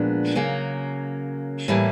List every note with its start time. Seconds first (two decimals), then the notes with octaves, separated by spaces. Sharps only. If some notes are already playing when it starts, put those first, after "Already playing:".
Already playing: A#2 F3 G#3 B3 D4
0.35 C#3 F#3 A#3
1.68 A2 E3 G3 A#3